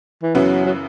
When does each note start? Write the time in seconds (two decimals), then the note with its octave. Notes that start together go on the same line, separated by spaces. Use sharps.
0.23 E3
0.35 F#2 C#3 E3 F#3 B3 E4
0.66 F#3